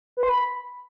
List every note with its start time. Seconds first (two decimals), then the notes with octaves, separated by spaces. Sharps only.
0.17 B4
0.23 C6
0.29 B5